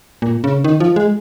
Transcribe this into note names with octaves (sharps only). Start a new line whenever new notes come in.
A#2
C#3
D#3
F3
G#3